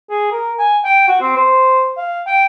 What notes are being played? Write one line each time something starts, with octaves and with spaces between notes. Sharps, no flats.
G#4
A#4
G#5
G5
F#4
C4
C5
F5
G5